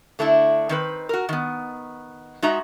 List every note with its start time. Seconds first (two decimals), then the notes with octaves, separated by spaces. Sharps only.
0.19 D3 A3 D4 E4
0.69 D#3 C4 B4
1.09 F#4 A#4
1.29 D#3 B3
2.42 G#3 D#4 F#4 E5 A#5